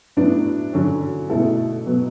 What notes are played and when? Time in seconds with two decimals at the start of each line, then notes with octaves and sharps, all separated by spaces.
0.17 A2 F#3 B3 D4
0.73 D3 F#3 C#4
1.30 B2 A3 E4 A4
1.86 B2 F#3 B3